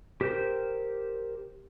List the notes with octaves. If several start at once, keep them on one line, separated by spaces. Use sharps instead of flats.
G4 A#4 C5 G6